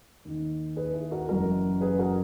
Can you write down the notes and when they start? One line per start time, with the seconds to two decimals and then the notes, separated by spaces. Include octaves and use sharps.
0.25 D#2 D#3
0.76 G#4 B4
0.94 E4 G#4
1.11 F#4 A#4
1.29 F#1 F#2 E3 F#4 A#4
1.81 G#4 B4
1.99 F#4 A#4